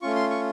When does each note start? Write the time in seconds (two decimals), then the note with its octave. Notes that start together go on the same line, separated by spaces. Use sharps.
0.02 A3 C#4 F4 C#6
0.15 C6
0.30 C#6